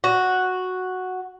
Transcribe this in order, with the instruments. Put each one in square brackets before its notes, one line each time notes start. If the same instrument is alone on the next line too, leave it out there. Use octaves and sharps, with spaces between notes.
[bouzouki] F#4